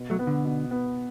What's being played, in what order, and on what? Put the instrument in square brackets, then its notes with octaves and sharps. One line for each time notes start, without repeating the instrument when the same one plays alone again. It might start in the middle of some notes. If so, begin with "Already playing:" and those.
Already playing: [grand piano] B2
[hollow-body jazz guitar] F#3 A3
[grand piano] B3
[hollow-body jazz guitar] D3
[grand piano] B2
B3